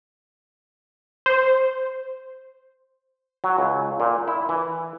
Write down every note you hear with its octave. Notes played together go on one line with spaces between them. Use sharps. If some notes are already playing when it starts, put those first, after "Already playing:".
C5
F#3
C#2
A#2
E4
E3